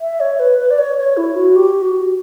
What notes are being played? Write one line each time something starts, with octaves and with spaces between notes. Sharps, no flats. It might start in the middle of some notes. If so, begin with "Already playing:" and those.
E5
C#5
B4
B4
D5
C#5
C#5
E4
F#4
G4
F#4